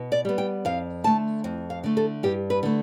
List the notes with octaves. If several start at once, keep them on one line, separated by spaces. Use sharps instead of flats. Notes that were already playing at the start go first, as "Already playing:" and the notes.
Already playing: B2
D5
G3 B3
G5
F2 F5
D3 A3 A5
F2
F5
D3 A3
A4
G2 G4
B4
D3 A3